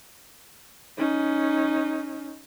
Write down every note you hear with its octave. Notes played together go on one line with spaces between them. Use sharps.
C#4 D#4